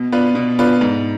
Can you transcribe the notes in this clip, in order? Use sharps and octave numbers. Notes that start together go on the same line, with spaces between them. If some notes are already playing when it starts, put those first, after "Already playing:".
Already playing: B2
B3 D4 F4 B4
B2
B3 D4 F4 B4
G#2